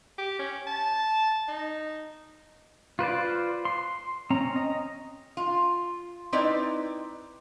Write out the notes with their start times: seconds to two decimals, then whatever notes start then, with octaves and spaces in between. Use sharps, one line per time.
0.18 G4
0.39 C#4
0.67 A5
1.48 D#4
2.99 F4 B4 C5 D5
3.65 C6
4.30 C4 C#4 A#5
4.56 D#5
5.37 F4
6.33 C4 D#4 E4 B4 D5